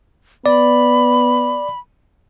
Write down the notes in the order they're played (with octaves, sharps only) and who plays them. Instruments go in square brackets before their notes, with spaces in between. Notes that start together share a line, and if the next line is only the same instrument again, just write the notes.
[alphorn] B3 [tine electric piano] D5 [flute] B5